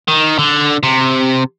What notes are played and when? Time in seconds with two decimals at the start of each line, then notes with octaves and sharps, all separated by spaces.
0.08 D#3
0.39 D3
0.83 C3